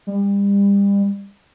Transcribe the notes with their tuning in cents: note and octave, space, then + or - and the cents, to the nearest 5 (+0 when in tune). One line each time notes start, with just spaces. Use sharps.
G3 +35